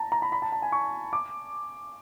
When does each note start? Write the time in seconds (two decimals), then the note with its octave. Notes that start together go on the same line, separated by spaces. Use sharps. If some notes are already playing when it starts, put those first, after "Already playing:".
Already playing: A5 A#5
0.12 A#5
0.22 B5
0.32 B5
0.42 A5
0.52 A5
0.62 G#5
0.72 C#6
1.13 D6